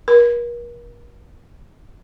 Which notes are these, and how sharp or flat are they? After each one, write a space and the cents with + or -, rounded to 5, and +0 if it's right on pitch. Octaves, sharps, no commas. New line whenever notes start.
A#4 +40